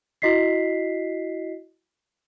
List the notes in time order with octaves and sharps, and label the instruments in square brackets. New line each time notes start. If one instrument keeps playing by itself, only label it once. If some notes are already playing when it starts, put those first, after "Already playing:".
[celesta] E4 F#4 D#5 B6 C7